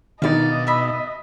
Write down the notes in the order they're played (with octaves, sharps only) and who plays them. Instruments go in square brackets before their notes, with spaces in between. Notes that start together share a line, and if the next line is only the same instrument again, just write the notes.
[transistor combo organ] B2 [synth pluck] D#3 D4 D#4 [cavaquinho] D5 F5 [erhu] D#5
[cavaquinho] E5 B5